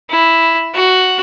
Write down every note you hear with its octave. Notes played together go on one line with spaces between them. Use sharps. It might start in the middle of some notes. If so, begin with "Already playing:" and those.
E4
F#4